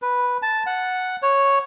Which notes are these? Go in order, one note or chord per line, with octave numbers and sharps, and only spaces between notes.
B4
A5
F#5
C#5